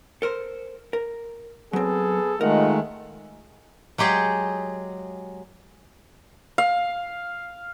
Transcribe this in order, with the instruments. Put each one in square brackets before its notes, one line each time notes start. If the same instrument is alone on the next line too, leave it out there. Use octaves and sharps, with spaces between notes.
[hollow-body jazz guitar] A4 A#4 C5
A#4
[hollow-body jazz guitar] F#3 C4 [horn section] B3 G#4 A4
[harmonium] D#3 G#3 A3 [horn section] D#4 F4 F#5 [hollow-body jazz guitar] A#4
[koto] F#3 G#3 G4 G#4
[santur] F5